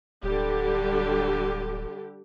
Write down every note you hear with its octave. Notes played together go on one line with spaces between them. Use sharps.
D1 D3 G3 G4